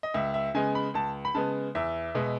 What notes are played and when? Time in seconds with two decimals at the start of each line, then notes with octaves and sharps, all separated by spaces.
0.03 D#5
0.14 C#2 E5
0.34 E5
0.55 C#3 G#3 B3 G#5
0.75 B5
0.94 C#2 A5
1.25 B5
1.35 C#3 G#3 B3 A5
1.75 E2 E5
2.15 B2 G#3 B3